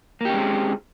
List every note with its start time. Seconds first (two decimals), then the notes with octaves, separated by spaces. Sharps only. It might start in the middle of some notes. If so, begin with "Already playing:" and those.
0.21 A#3
0.25 G4
0.30 C#4
0.34 G#3
0.38 C4